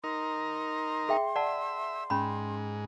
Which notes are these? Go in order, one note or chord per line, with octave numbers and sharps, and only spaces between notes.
D#4 A#4 C6
G#4 E5 G5
D5 E5 F#5 A5
G#2 C#4 B5